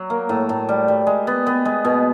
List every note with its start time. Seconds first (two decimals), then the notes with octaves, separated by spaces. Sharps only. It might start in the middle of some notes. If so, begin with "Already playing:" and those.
Already playing: F#3
0.10 A#3
0.29 A2
0.49 A2
0.69 G3
0.88 G3
1.07 G#3
1.27 B3
1.47 B3
1.65 G#3
1.85 B2